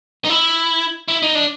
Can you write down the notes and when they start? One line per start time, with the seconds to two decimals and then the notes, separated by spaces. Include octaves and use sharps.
0.25 D#4
0.29 E4
1.08 E4
1.23 D#4
1.35 D4